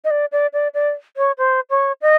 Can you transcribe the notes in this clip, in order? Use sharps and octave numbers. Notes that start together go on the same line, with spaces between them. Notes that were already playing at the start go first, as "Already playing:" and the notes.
D#5
D5
D5
D5
D5
C#5
C5
C#5
D#5